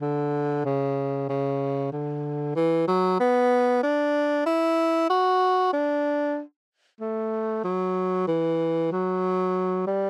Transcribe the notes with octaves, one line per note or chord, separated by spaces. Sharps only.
D3
C#3
C#3
D3
E3
F#3
B3
D4
E4
F#4
D4
A3
F#3
E3
F#3
G3